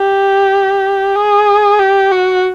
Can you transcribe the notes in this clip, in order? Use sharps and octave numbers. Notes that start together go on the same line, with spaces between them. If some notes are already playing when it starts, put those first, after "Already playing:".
Already playing: G4
G#4
G4
F#4